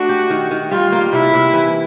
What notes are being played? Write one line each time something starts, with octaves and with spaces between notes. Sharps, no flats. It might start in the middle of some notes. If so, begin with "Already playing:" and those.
Already playing: A3 D4 F#4
G4
D#3
D#3
G3 F4
A#3
C3 E4
C3
E3